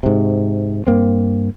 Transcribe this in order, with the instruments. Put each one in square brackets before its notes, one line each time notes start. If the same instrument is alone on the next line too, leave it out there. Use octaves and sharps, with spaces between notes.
[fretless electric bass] G#2 C3
G2 A#3 C4